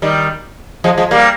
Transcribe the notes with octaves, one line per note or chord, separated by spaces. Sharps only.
D#3 G3
F3 G#3
F3 G#3
G3 A#3